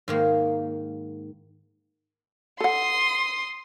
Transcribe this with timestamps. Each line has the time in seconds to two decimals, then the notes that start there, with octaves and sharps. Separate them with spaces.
0.08 G#2 D#3 A#3
2.60 A4 F#5 C6 D#6